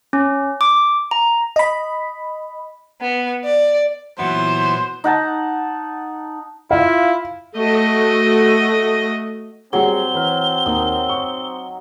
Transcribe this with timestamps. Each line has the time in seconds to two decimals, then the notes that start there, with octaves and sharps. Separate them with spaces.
0.13 C#4
0.61 D6
1.11 A#5
1.56 D#5 B5
3.01 B3
3.44 D5
4.19 A#2 E3 F#3 B3 E4 C5
5.04 D#4 F#5 A5
6.71 E4 F4 F5
7.57 A3 F#4 D#5
9.73 F#3 G3 C4 G#4 G7
10.14 E3 B4 F6
10.66 D#2 D#4
11.10 C#6